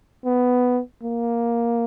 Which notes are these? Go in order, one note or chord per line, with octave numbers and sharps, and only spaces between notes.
B3
A#3